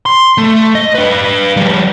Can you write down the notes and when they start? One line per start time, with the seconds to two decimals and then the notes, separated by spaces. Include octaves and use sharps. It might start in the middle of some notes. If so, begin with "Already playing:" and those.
0.06 C6
0.38 A3
0.75 D#5
0.95 D4 B4
1.57 F3 G3